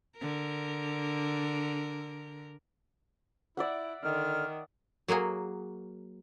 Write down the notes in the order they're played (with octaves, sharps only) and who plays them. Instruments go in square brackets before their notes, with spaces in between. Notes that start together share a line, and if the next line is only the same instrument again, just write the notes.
[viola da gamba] D3 A#4
[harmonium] E4 [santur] D5 E5 F#5
[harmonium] D3 [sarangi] D#3 [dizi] F6
[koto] F#3 A#3 F#4 G#4